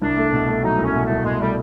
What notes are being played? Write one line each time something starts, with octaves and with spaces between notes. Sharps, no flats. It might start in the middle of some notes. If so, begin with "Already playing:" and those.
C2 D4
A3
B2
A3
F#3 D#4
C2
C#4
B2
A3
C2
B2 G#3
G3 A3